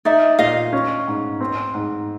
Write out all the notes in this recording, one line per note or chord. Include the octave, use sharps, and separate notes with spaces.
D#4 D5 E5
A#2 D#5 F5
C#4
G#2
C4
G#2